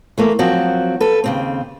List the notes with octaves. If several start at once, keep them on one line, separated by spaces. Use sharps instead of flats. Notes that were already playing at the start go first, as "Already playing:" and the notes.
E3 A3 A#3
F3 F#3 C4 F#4
A4 B4
D#2 C#3 C4